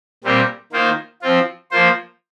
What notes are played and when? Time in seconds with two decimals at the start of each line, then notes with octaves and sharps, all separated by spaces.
0.24 A#2 G3 C4 G4 A#4
0.72 D#3 A#3 F4 C5
1.22 F3 C4 F4
1.71 F3 A#3 F4 C5